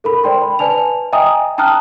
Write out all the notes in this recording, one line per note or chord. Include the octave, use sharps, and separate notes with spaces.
A4 A#4 B5
C5 D5 G5 C6
B5
B4 D5 G#5 A5 F7
D#5 E5 G5 G#5 A#5 D#6
G5 A5 A#5 D#6 F6 F#6